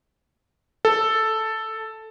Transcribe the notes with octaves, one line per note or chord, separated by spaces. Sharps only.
A4